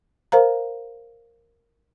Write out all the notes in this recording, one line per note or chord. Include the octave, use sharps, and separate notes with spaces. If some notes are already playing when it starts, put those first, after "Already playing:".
A#4 C5 F5 A#5